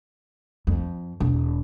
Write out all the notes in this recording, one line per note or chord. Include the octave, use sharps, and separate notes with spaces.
F2
E1